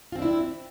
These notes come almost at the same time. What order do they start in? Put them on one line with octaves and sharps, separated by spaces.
F4 C4 D4 E4